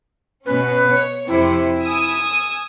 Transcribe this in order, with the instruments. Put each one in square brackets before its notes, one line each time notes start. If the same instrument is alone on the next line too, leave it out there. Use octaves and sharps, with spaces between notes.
[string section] B2 C#4 [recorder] B4
[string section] C#5
[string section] F2 C3 [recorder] E4
[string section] G#5 D#6 E6